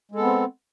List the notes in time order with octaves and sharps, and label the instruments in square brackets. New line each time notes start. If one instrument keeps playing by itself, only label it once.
[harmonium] G#3
A4
B3
C4